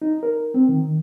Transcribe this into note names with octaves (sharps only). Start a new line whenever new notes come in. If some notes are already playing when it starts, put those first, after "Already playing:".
D#4
A#4
C4
D#3